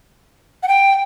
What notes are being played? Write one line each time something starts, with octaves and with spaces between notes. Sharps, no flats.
F#5
G5